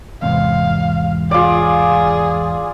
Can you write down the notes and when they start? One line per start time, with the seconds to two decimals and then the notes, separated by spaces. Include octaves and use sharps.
0.22 E2 G#2 C3 F5
1.31 F4 G#4 D5